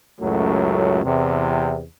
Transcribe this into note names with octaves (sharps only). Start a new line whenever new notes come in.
C#2 F#2 A2 F#3 A3
E2 C3